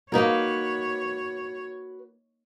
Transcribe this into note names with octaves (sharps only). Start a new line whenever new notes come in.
A#3 D#4 F#4 A#4 B4 C#5